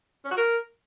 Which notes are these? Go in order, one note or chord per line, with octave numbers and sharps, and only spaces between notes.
C#4
F#4
A#4